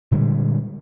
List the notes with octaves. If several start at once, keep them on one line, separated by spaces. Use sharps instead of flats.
A#2 D3 G3 G#3